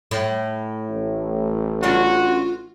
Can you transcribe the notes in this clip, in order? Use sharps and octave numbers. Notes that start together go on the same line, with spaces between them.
A2
A1
C#3 C#4 D4 F4 F#4